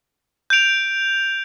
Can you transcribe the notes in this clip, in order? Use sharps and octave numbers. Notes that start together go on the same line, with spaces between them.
G6 D7 F7